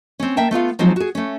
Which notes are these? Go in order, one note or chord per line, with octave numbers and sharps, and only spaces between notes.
C4 C#4
A#3 E5 G5 A5
A3 B3 F4 F5
F3 F#3 G#3 C4 D#4 F4
F#4 G#4
A3 C#4